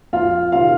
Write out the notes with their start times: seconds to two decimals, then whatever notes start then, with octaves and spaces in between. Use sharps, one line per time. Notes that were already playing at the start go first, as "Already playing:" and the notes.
0.13 F2 F4 F5
0.52 C3 D#3 F4 F5